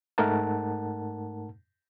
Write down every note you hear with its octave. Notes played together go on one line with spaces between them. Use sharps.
G#2 A3 D#4 A#4 F#5 A5